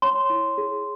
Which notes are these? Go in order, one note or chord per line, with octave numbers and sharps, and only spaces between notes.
C#5 C6
E4
G#4